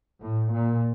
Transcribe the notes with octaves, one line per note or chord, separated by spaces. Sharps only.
A2
A#2